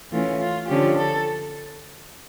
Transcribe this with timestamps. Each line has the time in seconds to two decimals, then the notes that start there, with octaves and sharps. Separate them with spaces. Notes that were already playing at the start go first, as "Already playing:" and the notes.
0.11 E3 A3 C#4 F4
0.40 F4
0.68 D3 F3 C#4 G4
0.97 A4